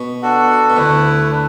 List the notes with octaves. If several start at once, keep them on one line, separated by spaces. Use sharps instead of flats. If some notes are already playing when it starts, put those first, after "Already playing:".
Already playing: B2
D4 F#4 A4 F#5
B2
D2 D3 A3 E4 B4
D4 B4